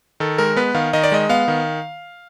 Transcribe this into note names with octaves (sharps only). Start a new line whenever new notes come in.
D#3 A4
G#3 A#4
B3 B4
D#3 F5
D#3 D#5
D5
G#3 D#5
B3 F5
D#3